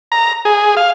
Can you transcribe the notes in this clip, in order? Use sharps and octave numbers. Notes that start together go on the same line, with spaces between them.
A#5
G#4
F5